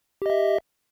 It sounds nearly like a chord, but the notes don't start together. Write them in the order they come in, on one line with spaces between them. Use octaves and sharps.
G4 D#5 E5